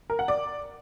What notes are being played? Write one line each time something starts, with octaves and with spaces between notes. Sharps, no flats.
A#4
F#5
D5